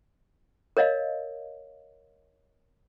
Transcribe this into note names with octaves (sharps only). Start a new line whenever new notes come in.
A#4 C#5 D#5 F5